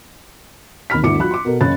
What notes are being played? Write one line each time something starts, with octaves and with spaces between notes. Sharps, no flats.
D#2 B5 F6 B6
G1 D2 E4 D6 C#7
F#3 F4 B5 F#6
C6 D6
B2 A4 A#4
F#1 C#3 C#4 B5 F#6 A6